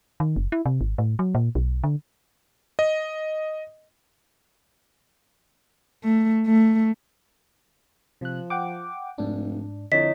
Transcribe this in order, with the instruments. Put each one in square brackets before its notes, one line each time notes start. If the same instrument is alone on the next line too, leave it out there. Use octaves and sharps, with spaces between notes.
[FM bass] D#3
F#1
E4
C3
G#1
A2
F#3
A#2
B1
D3
[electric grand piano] D#5
[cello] A3
A3
[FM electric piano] C3 F#6 [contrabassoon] F3
[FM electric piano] F#5 G5 D6
[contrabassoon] F1 [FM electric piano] G#2 D4
[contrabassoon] F2 [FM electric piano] D3 [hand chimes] E4 C#5 D#5 [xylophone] B6